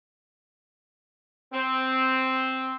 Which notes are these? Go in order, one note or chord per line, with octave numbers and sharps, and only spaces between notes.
C4